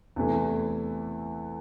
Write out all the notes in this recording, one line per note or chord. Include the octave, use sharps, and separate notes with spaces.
E2 C3 E3 A3